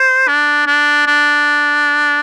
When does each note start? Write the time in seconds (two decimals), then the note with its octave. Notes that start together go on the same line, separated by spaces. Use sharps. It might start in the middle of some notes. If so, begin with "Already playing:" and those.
Already playing: C5
0.28 D4
0.67 D4
1.07 D4